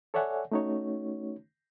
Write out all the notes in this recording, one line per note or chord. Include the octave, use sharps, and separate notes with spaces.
A4 C#5 D5 E5 F#5 G#5
A3 C#4 D#4 F#4 C#5